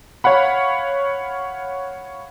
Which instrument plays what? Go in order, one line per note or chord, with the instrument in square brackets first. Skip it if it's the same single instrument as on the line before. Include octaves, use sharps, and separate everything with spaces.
[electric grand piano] C#5 F5 F#5 B5